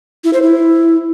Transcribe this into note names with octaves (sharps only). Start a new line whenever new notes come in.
E4
C5
E4